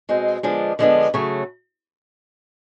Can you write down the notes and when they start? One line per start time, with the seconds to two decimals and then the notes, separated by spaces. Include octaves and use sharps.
0.09 B2 G#3 C4
0.43 D3 F3 G#3 B3 D4
0.79 D3 F3 G#3 B3 D4
1.14 C#3 F#3 A3